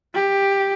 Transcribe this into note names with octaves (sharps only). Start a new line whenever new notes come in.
G4